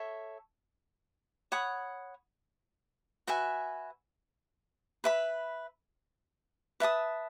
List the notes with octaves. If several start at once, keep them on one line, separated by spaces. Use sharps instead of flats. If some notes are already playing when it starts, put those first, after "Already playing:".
Already playing: A4 C#5 E5
C#5 F#5 B5 D#6
F#4 B4 E5 G#5
B4 E5 B5
B4 E5 A5 D#6